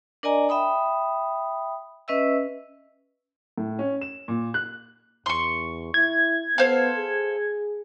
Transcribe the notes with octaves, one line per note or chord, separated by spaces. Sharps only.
D4 A#4 D5 D#5 G#5 A#5
E5 G5 B5 D#6
C#4 B4 D#5 E5 E6
A2
C#4
E7
A#2
F#6
E2 C6 C#6
E4 G#6
B3 A4 C5 F5
G#4